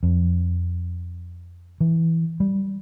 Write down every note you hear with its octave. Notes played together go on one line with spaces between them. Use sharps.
F2
E3
G3